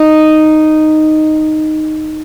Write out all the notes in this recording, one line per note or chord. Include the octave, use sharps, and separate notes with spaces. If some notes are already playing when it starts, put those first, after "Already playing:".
Already playing: D#4